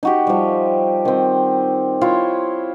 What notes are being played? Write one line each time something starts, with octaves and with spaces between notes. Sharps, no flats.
D#4 F#4 G4
F3 G3
D#3 C4
E4 F4 C5 C#5